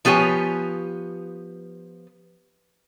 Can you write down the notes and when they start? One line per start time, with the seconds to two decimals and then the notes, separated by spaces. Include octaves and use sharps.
0.05 F3 B3 G4 C#5 G#5